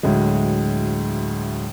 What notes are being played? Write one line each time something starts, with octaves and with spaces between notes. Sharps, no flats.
D2 A2 F#3 G#3